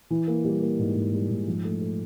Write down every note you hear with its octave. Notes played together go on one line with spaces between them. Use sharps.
E3
A#3
G3
A#3
G#2
G#2
G3
G#2
F3
A3
A3